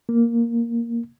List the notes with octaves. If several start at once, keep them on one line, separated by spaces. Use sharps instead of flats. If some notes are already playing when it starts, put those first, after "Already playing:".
A#3